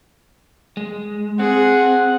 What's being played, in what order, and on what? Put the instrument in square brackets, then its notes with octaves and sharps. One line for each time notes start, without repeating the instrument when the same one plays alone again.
[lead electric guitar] G#3
[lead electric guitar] C4 [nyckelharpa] G#4 [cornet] F#5